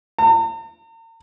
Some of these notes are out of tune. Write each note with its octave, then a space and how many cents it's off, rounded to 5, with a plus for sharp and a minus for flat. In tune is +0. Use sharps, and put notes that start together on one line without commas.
A#5 -45